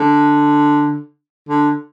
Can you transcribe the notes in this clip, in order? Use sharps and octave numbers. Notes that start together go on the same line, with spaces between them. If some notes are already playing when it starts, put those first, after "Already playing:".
Already playing: D3
D3